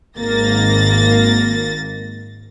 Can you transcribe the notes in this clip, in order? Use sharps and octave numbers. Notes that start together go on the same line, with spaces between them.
G#1 A#3 A6 A#6